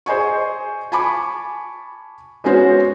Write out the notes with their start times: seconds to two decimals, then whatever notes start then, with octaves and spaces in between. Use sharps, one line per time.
0.06 G#4 C5 D#5 G#5 C#6
0.92 G#5 A5 B5 C#6 D6
2.44 G#3 B3 C#4 F#4 C5 C#5